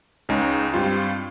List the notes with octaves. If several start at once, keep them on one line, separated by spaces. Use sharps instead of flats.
C#2 C#3 G#3 D#4
G2 G3 C4 F4